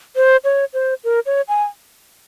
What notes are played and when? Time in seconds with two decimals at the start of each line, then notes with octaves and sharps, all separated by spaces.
0.16 C5
0.44 C#5
0.74 C5
1.04 A#4
1.26 C#5
1.48 G#5